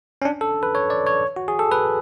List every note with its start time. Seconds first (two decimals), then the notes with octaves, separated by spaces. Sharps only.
0.22 C#4
0.25 D4
0.41 A4
0.63 B4
0.75 C#5
0.90 D5
1.06 C#5
1.36 F#4
1.48 G#4
1.59 A4
1.72 B4